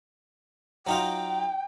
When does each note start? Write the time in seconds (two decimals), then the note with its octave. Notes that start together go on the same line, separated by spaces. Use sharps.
0.87 F#3 D#4 F4 G5